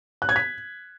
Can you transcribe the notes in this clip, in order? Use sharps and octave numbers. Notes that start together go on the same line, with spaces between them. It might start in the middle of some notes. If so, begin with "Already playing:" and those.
F#6
G#6
B6